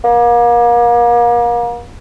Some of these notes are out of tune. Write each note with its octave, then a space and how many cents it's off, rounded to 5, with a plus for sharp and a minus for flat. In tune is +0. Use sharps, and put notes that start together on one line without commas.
A#3 +35